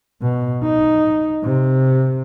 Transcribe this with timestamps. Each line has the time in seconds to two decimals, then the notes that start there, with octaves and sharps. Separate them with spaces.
0.22 B2
0.63 D#4
1.44 C3